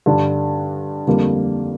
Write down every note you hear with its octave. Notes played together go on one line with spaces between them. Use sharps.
G2 D3 G3 D4
F2 D3 G3 A#3